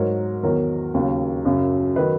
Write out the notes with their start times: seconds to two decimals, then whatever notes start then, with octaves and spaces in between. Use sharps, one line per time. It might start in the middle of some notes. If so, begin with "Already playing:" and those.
Already playing: G#2 F#3 A#4 C#5
0.43 E2 D#3 F#3 A#4 C#5
0.94 D#2 C#3 F#3
1.45 F#2 C#3 F#3
1.96 D#3 F#3 B4 D#5